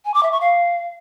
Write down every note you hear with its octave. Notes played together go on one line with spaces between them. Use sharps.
G#5
D6
E5
C#6
F5